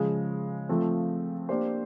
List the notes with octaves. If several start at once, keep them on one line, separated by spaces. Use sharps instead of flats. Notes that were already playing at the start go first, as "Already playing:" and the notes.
Already playing: C#3 F3 G#3
F3 A3 C4 F4
A#3 D4 G4 C5